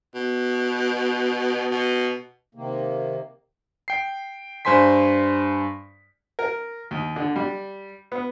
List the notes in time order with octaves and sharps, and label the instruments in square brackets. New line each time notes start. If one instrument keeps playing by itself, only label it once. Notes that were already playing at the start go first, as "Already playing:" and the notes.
[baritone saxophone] B2
B2
[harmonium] C3 D#3 A#3
[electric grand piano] G5 C7
G2 C5 G#5 C6 B6
[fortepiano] A#4
D#2
D3
G3
B3